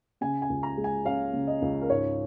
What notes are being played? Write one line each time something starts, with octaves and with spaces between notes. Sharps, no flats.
C#3 G#5
G#5
C#2
A#5
G#3
G#5
C#4 F5
C#3
D#5
C#2
A#4
G#2 C#5